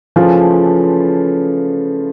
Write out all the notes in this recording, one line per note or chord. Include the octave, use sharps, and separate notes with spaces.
C#3 E3 F3 A3 F4